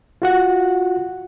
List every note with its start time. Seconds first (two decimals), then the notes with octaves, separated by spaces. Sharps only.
0.22 F4 F#4 F#5